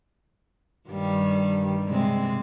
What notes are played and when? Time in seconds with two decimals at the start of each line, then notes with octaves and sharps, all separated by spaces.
0.89 G2 D#3 G3
1.88 C3 G#3 C4